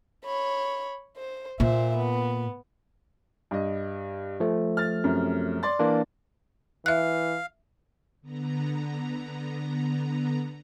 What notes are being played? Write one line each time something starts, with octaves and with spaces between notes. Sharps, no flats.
C#5 B5
C5
A#2 C5 E5
B3
G2 D#5
F3 A3
F6 A6
F#2 C3
D5 C6 A6
E3 A#3 D4
E3 E5 F5 F#6
D3 B3 A#5